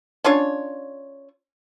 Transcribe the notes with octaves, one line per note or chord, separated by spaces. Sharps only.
C#4 D4 F4 C#5